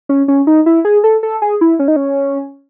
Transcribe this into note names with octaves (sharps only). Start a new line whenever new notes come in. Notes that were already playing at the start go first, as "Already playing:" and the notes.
C#4
C#4
D#4
E4
G#4
A4
A4
G#4
E4
C#4
D#4
C#4